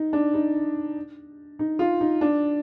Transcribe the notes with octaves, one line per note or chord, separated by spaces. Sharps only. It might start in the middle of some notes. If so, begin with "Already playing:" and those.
Already playing: D#4
D4
D#4
D#4
F4
D#4
D4